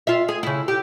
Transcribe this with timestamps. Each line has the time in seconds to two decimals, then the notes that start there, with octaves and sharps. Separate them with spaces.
0.07 F4 E5
0.28 G#4
0.43 C#3 E4
0.68 G4